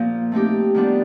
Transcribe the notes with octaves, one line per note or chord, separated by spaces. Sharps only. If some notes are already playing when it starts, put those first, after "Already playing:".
Already playing: A#2 F3 A#3
A3 C4 D#4 G4
D#3 G3 B3 D4 F4